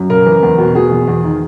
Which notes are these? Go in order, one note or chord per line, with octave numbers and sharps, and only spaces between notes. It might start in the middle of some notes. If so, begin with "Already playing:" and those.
Already playing: F#2
C#3 A#4
E3
E2
B2
B2 G#4
E2
E2
D#3